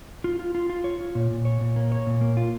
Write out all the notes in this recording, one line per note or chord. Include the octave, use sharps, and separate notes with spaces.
F4
F4
F4
F4
C#5
F4
A#2
A#2
C#5
A#2
A#3
C#5
A#2
A#3
F4